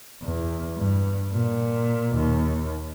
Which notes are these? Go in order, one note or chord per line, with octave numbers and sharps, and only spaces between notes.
E2
G2
A#2
D#2